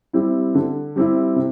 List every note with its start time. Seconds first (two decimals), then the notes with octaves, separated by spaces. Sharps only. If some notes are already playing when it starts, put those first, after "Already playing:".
0.13 G3 C4 E4
0.55 D3
0.96 G3 C4 E4
1.36 C3